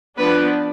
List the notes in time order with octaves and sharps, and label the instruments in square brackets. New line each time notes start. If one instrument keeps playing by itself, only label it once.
[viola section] F3 B3 D4 B4